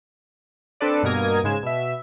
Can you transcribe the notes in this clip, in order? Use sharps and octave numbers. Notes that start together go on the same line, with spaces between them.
C4 D4 A4 B4 D5
G2 B2 A#3 A#4 D#6 G#6
G#2 C#3 G#3 G#6 E7
B2 E5